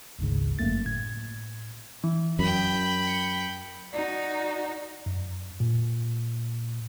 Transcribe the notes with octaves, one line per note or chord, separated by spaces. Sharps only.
G#1 D2 G#2 C#3
G1 F#2 A3 A#3 A6
A2 G#6
E3
F#2 G5 B5
C#7
D#4 F#4 D5
F#2
A#2